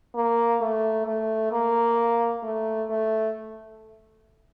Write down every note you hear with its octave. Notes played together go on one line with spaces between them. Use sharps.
A#3
A3
A3
A#3
A3
A3